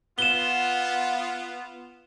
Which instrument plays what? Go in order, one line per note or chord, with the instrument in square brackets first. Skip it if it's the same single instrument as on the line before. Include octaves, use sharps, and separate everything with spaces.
[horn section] B3 F4 [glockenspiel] E7 G7